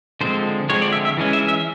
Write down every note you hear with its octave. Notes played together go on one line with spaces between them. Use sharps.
D3 F3 G#3 C4 C5
D3 F3 G#3 C4 C#5
D5
E5
E5
E3 G#3 C#4
E5
E5